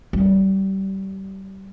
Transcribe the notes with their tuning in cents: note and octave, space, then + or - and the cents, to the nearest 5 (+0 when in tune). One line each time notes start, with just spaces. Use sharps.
G3 -25